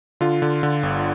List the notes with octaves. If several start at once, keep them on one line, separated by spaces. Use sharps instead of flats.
D3 F4
D3
D3
G1